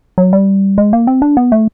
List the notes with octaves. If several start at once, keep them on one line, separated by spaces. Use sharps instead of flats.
F#3
G3
G#3
A#3
C4
D4
B3
A3